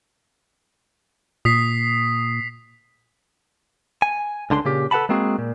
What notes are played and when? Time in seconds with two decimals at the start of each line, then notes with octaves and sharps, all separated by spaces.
1.45 A#2 D#6 B6 C7
4.02 G#5
4.50 C#2 D3 D4 C6
4.65 A#2 C#3 G4
4.91 A4 B4 F#5 A5 B5
5.09 G#3 A#3 C4 F#4 G#4
5.39 A#2